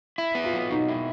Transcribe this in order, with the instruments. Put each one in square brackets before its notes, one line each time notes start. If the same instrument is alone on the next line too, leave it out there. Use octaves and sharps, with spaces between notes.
[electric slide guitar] E4
B3
[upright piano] F4
[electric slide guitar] F#3
[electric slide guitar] B2 [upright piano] D#4
[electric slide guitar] E4